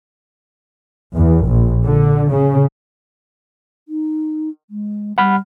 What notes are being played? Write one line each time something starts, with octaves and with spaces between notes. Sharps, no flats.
E2
A#1
D3
C#3
D#4
G#3
G3 F#5 B5 F6